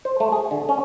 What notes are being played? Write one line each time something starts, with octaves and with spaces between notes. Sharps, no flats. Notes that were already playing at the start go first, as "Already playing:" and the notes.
C5
A3
G#4
D3
C#4